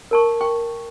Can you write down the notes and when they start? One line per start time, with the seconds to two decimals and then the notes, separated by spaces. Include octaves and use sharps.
0.11 A#4 A5 C#6
0.41 G5 C#6